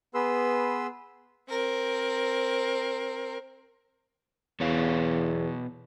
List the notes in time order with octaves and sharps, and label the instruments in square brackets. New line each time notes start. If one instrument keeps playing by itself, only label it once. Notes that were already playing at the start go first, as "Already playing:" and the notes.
[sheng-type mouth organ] B3 G#4 B4 C6 E6
[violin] C4 A#4
[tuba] E2 [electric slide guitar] B2 C#5 F5